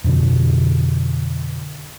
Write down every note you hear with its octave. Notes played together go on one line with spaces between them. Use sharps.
F2 B2 D3